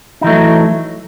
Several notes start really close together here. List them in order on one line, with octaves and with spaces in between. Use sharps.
D#4 E3 A3 F#3